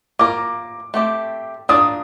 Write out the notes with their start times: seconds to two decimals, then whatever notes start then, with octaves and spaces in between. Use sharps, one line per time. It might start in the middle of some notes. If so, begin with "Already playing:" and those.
0.19 A#3 F4 A#4 D6
0.94 A3 C4 G4
1.69 D4 F4 A#4 D5 D#6